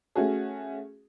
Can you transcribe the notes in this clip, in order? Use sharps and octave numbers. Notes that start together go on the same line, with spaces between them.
A3 C#4 F#4 G#4